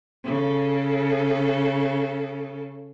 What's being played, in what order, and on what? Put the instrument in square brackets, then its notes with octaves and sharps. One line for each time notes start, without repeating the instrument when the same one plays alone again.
[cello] C#3 A4